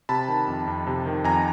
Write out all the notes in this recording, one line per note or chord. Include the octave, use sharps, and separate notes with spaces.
C3 A5 B5
D#3
F2
F2
C3
D#3
F2 G#5 A#5